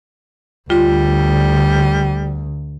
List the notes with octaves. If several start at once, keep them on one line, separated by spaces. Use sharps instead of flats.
D2 G3 F4